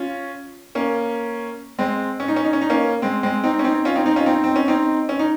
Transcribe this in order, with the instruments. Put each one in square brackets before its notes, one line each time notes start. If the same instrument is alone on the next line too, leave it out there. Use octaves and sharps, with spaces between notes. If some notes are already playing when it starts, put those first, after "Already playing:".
Already playing: [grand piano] C#4 F4
A#3 C#4
G#3 C4
C#4
D#4
C#4
D#4
C#4
D#4
A#3 C#4
G#3 C4
G#3 C4
C4 D#4
C#4
C4 D#4
C#4 F4
C4 D#4
C4 D#4
C#4 F4
C4 D#4
C4
C#4
C4 D#4
C#4
D#4